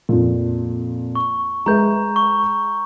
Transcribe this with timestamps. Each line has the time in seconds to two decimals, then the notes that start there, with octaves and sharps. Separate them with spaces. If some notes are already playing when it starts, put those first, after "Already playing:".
0.09 F2 A#2
1.15 C#6
1.66 G#3 B4 E5 A#5 G6
2.16 C#6